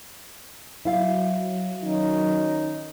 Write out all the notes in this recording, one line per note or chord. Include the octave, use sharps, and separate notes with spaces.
F#3 E4 F5
D#3 C#4 D#4